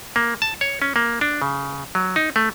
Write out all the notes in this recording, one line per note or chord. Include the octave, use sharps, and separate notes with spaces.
A#3
A5
C#5
C#4
A#3
D4
C#3
F#3
D#4
A3